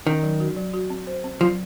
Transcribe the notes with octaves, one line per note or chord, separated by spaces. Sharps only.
D#3 C#4
F#3
F#4
F#3
F#4
C4
C5
C4
F3 F#3